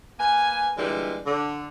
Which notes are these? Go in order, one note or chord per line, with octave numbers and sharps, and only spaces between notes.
A#3 B4 G#5
A#2 D3 E3 G3 G#3
D3